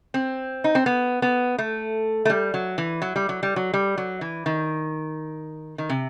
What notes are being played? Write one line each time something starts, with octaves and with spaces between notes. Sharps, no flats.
C4
D#4
C4
B3
B3
A3
A3
G3
F#3
E3
F#3
G3
F#3
G3
F#3
G3
F#3
E3
D#3
D#3
C3